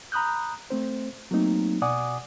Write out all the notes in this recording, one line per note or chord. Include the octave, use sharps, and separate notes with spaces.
A#5 B5 D#6 F#6 G6
A3 C4 C5
F#3 A3 A#3 C4 D#4
B2 D5 F#5 G#5 D6 D#6